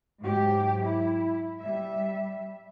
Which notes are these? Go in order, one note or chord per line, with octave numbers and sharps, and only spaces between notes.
G#2 F#3 G4
E4
G3 E5